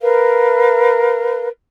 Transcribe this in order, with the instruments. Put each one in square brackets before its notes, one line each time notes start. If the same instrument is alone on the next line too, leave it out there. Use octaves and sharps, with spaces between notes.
[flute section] A#4 B4 F5